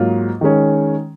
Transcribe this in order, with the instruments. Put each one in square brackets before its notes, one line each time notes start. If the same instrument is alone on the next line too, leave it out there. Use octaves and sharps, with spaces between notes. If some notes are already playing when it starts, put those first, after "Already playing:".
Already playing: [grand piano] G#2 F#3 A#3 F4
D#3 G#3 C#4